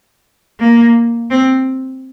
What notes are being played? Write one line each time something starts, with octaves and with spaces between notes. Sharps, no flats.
A#3
C4